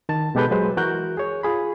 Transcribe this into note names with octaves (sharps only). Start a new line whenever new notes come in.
D#3 A5 A6
B2 G#3 G4 A4 B4 G6
F#3 G#3 B4 C5
E3 F#4 A#4 F#6 G6
G#4 C#5
F4 G#4 B5